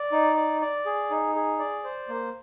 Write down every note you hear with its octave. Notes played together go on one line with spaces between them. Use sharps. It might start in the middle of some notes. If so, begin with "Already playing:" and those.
Already playing: D5
D#4
D5
D5
G#4
D#4
G#4
D5
C5
A#3